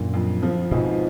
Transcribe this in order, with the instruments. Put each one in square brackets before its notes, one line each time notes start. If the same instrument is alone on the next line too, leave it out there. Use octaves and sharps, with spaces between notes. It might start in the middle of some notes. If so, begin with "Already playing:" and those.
Already playing: [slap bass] F#2 A#2 [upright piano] D3
[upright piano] F2
F3
[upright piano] F2 [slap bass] G#2 B2